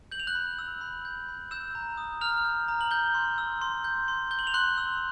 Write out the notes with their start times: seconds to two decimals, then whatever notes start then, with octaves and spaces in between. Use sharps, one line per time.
0.12 G6 F#7
0.20 F7
0.27 F#6 F#7
0.35 B5
0.59 E6
0.81 B5
1.05 G6
1.29 B5
1.51 E6 G6 E7
1.75 A#5
1.97 D#6
2.21 A#5 F6 F7
2.45 G6
2.68 A#5
2.81 F#7
2.91 G6 G7
3.14 C6
3.38 E6
3.62 C6
3.84 G6
4.08 C6
4.31 G6 G7
4.39 F#7
4.47 F7
4.54 C6 F#6 F#7
4.78 E6